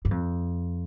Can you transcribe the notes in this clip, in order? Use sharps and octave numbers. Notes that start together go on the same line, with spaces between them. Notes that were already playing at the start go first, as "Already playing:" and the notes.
G2
F2